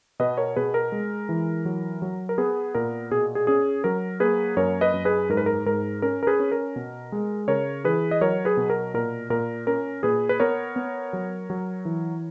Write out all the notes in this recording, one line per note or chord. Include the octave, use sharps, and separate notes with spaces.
B2 B4 D#5
A#4 C#5
B2 G#4 B4
A#4
G#3
E3
F#3
F#3
A#4
B3 G#4 B4
A#2 A#4
B2 G#4
G#4
C#4 G#4
F#3 A#4
A#3 G#4 B4
F#2 A#4 C#5
B4 D#5
F#2
G#4 B4
G#2 A#4
B4
A#4
G#2 A#4
C#4 A#4
A#4
G#4 B4
C#4
A#4
B2
G#3
C#3 A#4 C#5
E3 G#4 B4
D#5
F#3 A#4 C#5
G#4 B4
B2
A#4
A#2 A#4
A#2 A#4
C#4 A#4
A#2 G#4 B4
B4
B3 A#4 C#5
B3
F#3
F#3
E3